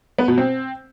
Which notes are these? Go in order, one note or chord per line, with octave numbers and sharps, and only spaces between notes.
B3
B2
C4